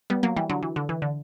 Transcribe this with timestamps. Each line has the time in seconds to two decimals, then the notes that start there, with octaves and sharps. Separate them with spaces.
0.10 G3 B3
0.23 F#3 A#3
0.37 E3 G3
0.50 D3 F#3
0.63 E3
0.76 D3
0.89 E3
1.02 D3